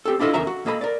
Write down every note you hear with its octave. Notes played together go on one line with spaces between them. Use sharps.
C4 G4 A4
D4 E4 F4 A4 D#5
E2 C#3 A#4 E5 A#5
F#4
A#3 A4 D#5 A#5 B5
A#4 D5